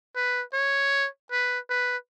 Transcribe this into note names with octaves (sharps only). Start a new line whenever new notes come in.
B4
C#5
B4
B4